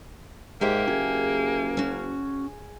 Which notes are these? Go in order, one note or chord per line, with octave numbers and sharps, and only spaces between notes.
G#2 A#3 G4 E5 G5
F#1 G#4
C#4 F#4